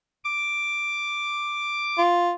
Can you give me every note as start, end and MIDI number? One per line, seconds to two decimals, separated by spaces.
0.24 2.02 86
1.98 2.33 65